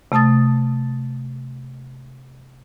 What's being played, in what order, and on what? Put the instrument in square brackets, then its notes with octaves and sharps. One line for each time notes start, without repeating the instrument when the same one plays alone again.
[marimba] C3 A3 A5 D#6 A6